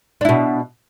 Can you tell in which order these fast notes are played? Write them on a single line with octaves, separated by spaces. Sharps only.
D4 E4 B2